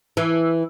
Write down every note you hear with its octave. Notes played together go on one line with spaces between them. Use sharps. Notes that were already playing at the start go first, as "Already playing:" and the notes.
E3